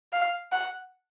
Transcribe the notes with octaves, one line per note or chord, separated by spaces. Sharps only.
F5
F#5